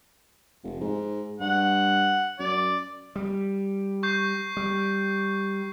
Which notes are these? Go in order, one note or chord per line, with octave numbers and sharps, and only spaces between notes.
F1
G#2
G2 F#5
F#2 D5
G3
C#6 G6 C7
G3